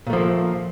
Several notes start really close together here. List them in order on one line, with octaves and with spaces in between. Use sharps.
A#2 A3 F3 A#3